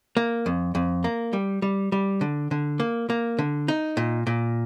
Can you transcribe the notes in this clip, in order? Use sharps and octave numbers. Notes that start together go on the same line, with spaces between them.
A#3
F2
F2
A#3
G3
G3
G3
D3
D3
A#3
A#3
D3
D#4
A#2
A#2